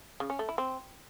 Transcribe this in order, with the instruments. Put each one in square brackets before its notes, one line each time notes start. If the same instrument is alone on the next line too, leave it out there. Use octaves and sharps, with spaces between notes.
[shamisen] C#3
C#4
A3
E4
C4